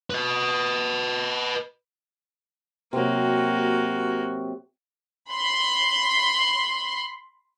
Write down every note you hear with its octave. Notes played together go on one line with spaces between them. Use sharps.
B4 D#5
C3 F#3 A#3 F#4
B5 C6